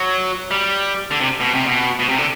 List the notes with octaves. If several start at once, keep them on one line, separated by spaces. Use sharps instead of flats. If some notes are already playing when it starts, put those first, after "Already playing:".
Already playing: F#3
G3
D3
C3
B2
C3
B2
B2
C3
D3